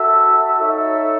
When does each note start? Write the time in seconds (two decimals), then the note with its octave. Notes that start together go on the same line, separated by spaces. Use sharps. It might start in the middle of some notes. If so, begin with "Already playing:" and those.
Already playing: F#4 A4 E5
0.59 D#4 A4 C#5 E5